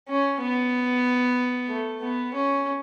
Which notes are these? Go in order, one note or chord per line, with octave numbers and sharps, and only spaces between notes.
C#4
B3
A3
B3
C#4